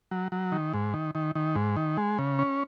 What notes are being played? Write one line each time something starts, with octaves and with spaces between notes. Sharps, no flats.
F#3
F#3
D#3
G#2
D#3
D#3
D#3
G#2
D#3
G#3
C#3
C#4